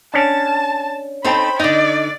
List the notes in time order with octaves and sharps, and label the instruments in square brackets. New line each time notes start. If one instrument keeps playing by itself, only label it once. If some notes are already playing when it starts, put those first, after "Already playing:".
[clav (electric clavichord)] C#4 D4 [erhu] A5
[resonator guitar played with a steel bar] C4 D#4 A4 [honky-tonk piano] C5 G5 [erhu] B5
[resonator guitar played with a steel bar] D3 D#4 [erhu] D5 [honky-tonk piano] D#5